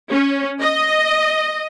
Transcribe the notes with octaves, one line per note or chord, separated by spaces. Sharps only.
C#4
D#5